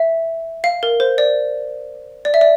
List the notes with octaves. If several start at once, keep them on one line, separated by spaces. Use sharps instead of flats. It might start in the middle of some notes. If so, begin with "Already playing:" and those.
Already playing: E5
F5
A#4
C5
D5
D5
E5
D5